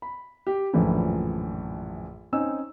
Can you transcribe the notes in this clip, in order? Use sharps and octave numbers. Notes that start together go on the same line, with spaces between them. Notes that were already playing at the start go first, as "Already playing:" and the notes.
B5
G4
A#1 F#2 A2 D3 E3 F3
C4 C#4 D#4 G#5 E6